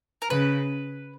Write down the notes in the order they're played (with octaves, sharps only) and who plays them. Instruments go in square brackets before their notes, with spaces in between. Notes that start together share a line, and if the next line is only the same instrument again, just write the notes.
[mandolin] A#4
[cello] C#3 [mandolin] B4